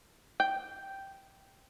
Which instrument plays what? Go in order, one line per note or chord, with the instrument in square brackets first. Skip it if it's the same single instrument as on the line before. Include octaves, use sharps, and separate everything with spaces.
[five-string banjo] G5